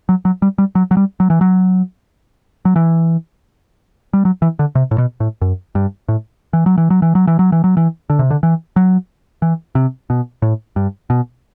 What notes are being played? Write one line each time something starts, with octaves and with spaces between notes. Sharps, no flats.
F#3
F#3
G3
G3
F#3
F#3
G3
F#3
E3
F#3
F#3
E3
G3
F#3
E3
D3
C3
A2
B2
A2
F#2
G2
A2
E3
F#3
E3
F#3
E3
F#3
E3
F#3
E3
F#3
E3
D3
C3
D3
E3
F#3
E3
C3
B2
A2
G2
B2